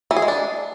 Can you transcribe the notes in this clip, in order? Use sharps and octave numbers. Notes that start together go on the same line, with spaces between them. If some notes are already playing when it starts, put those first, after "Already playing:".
E3
G#4
G#3
D4